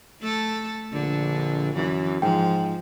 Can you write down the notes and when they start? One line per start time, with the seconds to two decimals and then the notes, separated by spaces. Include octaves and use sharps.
0.21 A3 A4
0.93 A#1 D3
1.75 F#2 E3
2.22 G#2 F3 G5